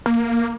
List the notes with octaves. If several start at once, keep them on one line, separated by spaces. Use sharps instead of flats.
A#3